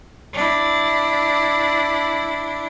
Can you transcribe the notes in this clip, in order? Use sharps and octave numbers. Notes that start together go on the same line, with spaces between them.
D4 E4